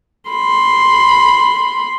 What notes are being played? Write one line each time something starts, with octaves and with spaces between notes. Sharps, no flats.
B5 C6